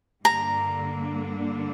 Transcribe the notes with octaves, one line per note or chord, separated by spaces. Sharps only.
G2 D3 A#3 D4 A#5